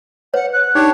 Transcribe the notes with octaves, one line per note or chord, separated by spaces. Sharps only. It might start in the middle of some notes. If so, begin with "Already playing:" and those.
B4 C#5 F#5
F#6
D4 D#4 G4 C#5